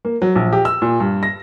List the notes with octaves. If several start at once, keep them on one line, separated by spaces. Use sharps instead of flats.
A#3
F#3
A#1
G4
E6
A#2
G2
A#6